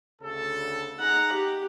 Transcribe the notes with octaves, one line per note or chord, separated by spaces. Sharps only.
D2 C#3 A4
D#4 G#4 F#5 A#5
G4